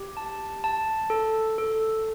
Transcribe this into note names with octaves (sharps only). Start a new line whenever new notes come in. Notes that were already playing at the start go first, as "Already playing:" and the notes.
Already playing: G4
A5
A5
A4
A4